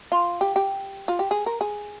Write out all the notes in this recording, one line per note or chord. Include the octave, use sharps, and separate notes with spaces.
F4
G4
G4
F4
G4
G#4
A#4
G#4